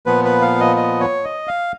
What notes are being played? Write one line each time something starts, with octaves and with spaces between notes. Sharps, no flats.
A#2 F3 B3 B4
B4
F5
D#5
D#5
C#5
D#5
F5